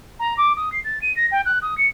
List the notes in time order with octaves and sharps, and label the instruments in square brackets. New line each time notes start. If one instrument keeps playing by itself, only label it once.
[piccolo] A#5
D6
D#6
C7
A6
D#7
A#6
G5
F#6
D#6
C#7